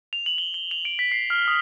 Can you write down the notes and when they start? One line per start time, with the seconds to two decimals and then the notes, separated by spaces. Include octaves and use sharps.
0.13 F7
0.26 F#7
0.38 G7
0.54 G7
0.71 F7
0.85 D7
0.99 B6
1.12 C7
1.30 F6
1.48 D#6